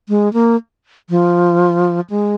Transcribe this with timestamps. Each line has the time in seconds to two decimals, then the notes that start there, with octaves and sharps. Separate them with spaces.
0.09 G#3
0.33 A#3
1.10 F3
2.10 G#3